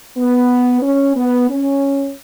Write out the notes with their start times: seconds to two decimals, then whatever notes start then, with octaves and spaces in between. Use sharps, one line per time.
0.17 B3
0.83 C#4
1.16 B3
1.49 C#4